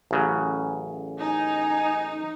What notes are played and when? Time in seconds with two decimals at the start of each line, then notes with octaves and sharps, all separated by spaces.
0.11 A1 C#3 F#3
1.20 D#4 G#5